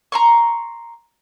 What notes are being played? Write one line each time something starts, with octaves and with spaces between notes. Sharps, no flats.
A#5 C6 C#6